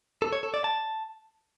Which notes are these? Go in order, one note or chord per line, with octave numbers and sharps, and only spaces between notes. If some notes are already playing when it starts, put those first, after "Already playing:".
A4
C#5
A4
D5
A5